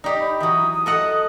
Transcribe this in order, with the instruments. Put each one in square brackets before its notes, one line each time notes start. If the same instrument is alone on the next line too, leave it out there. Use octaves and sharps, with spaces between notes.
[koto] D#4 G4 [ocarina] D5
[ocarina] B5
[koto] E3 F#3 [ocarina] D#6
[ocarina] D#6
[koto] A4 D#5 F#5